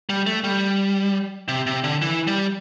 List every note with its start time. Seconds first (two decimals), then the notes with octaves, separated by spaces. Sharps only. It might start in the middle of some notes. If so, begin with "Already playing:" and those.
0.09 G3
0.26 A3
0.44 G3
1.48 C3
1.67 C3
1.84 D3
2.02 E3
2.27 G3